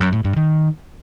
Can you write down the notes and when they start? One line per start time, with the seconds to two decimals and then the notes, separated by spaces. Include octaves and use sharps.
0.01 F#2
0.13 A2
0.25 G2
0.37 D#3